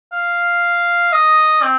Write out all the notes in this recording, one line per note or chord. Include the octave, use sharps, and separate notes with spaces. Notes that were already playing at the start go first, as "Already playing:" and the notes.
F5
D#5
C4